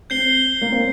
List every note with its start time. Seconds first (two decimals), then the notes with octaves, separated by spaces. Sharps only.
0.10 C4 G6 C7 G7
0.61 A#3
0.72 C4